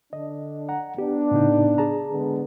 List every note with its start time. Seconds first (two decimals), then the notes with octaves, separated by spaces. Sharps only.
0.13 D3 D4 D#5
0.69 F#5 A#5
0.98 B3 D4 G4
1.31 A2 C#3 D#4
1.78 G#4 A5 A#5
2.11 D3 G#3 B3